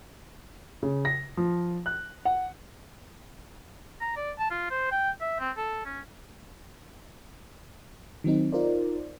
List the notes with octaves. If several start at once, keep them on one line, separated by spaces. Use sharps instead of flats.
C#3
A#6
F3
F#6
F#5
A#5
D5
A5
F4
C5
G5
E5
C4
A4
C#4
D#3 F#3 C4 D#4
D#4 F4 A#4 C5 D5